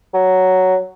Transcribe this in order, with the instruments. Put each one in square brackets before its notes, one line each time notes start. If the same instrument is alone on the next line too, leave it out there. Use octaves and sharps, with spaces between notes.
[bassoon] F#3